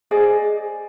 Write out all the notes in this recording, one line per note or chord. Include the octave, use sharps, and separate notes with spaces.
G#4 C5 D5 D#5